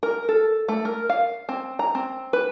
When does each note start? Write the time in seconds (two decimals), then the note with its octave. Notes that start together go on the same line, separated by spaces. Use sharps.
0.03 A#4
0.29 A4
0.68 A3
0.85 A#4
1.10 F5
1.49 C4
1.79 A#5
1.95 C4
2.33 B4